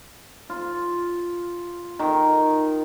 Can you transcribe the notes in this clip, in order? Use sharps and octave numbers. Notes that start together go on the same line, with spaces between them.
F4
D#3